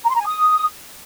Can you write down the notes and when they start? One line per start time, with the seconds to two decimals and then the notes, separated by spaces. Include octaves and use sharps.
0.05 A#5
0.10 C6
0.15 A#5
0.21 G#5
0.26 D#6